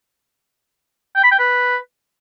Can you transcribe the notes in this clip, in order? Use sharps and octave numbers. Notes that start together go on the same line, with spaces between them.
G5
B5
G5
B4